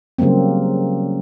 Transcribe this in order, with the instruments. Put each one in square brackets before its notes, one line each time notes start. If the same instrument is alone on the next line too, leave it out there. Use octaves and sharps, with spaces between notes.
[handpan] C#3 F#3 G3 A#3 C4